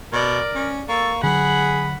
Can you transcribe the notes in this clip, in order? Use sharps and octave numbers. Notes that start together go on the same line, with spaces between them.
B2 A#4 D5
C#4
A#3 A4 C#6
D3 F#3 G#4 F#5 B5